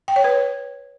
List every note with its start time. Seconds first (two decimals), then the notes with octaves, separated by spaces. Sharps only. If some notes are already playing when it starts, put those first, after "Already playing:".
0.08 G5
0.16 C#5
0.24 B4